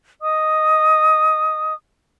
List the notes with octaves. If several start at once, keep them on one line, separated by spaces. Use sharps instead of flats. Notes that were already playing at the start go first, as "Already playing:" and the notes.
D#5 D#6